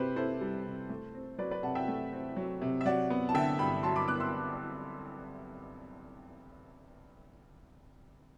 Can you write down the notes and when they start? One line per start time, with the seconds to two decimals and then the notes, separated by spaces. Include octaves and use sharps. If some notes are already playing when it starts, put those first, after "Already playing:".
Already playing: C3 C4 G4 B4 C5
0.16 E4 A4 C5
0.41 G3
0.65 C3
0.90 A3
1.14 C4
1.38 F#3 B4 D5
1.51 B4 D5
1.63 C3 F#5 A5
1.75 E5 G5
1.88 A3
2.12 C4
2.36 F#3
2.62 C3
2.81 E5
2.86 F#3 D5 F#5
3.10 B3
3.29 A5
3.34 D3 E5 G5
3.59 G2 G5 B5
3.83 F#3 A5 C6
3.96 B5 D6
4.08 B3 D6 F#6
4.20 C6 E6